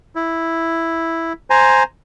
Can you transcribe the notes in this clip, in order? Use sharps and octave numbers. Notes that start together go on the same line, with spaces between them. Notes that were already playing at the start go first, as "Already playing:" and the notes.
E4
C5 G#5 A#5